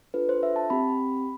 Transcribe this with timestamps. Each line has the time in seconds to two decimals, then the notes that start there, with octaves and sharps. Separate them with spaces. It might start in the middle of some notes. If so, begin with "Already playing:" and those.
0.14 D4 F4 A4 B4
0.29 C5
0.43 E5
0.56 A5
0.70 C4 G4 B5